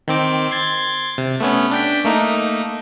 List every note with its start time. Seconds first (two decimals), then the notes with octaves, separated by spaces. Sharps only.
0.08 D#3 C4 D6
0.51 C6 G#6 A6
1.18 C3
1.40 A3 B3 C#4
1.71 D4 G5 B6
2.04 A3 A#3 D#4